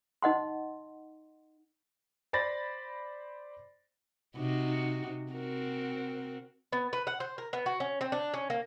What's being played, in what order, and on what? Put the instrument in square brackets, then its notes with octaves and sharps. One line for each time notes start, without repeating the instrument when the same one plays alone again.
[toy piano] D#4 D#5 F#5 C6
[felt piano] C5 D5 B5 A6 A#6
[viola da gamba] C3 D#4 F#4
C4 F#4 A#4
[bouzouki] B3
B4
F#5
C5
A#4
B3
F#4
C#4
C4
D4
C#4
A#3